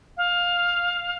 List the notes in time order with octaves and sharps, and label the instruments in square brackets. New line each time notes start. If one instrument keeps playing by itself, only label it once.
[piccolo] F5